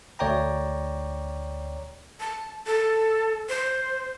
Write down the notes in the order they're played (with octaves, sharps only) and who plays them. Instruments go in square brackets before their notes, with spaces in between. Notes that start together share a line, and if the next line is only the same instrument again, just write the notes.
[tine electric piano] D2 C#5 D5 G5 A#5
[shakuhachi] A5
A4
C5